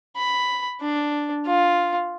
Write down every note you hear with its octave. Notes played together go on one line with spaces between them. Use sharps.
B5
D4
F4